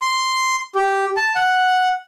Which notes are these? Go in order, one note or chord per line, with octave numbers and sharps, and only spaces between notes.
C6
G4
A5
F#5